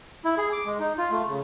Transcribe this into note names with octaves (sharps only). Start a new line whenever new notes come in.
E4
G#4
D6
G#3
D#4
F4
A3
C#3